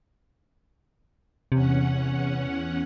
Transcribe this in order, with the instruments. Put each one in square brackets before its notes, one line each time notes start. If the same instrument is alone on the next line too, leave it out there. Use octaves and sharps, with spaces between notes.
[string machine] E2 C#4 F#5 [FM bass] C3